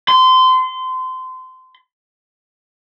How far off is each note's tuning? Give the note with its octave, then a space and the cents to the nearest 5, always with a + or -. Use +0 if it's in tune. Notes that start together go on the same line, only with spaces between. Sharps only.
C6 -25